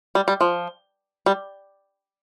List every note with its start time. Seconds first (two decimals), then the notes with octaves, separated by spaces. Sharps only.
0.15 G3
0.28 G3
0.41 F3
1.26 G3